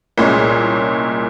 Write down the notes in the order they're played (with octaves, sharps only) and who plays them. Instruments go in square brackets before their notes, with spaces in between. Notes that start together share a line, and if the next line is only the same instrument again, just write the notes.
[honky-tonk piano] C2 A#2 G#3 C#4